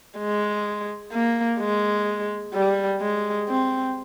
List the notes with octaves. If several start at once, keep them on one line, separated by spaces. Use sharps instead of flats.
G#3
A#3
G#3
G3
G#3
C4